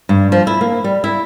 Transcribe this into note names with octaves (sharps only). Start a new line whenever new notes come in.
G2
F3
E4
A#3
G3
E4